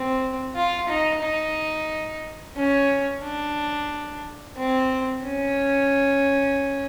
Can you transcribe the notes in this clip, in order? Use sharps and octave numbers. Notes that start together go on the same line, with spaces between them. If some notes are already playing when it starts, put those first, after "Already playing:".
Already playing: C4
F4
D#4
D#4
C#4
D4
C4
C#4